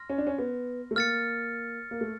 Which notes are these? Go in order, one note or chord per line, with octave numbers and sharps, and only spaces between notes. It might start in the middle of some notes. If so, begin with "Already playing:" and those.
Already playing: C6 F6 A#6
C#4
D4
C#4
B3
A3
A#3 F6 A6 C#7
A#3
A3